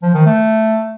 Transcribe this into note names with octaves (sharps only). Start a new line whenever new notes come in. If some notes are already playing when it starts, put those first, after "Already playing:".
F3
D#3
A3